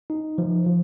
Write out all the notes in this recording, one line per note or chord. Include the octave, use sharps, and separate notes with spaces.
D#4
F3
F3